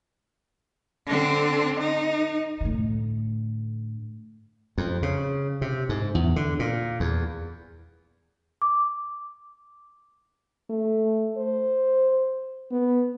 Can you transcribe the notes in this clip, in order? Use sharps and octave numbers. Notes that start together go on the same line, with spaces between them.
D3 C4
D#4
A2 D3
F2
C#3
C3
G#2
E2
D3
A#2
E2
D6
A3
C5
B3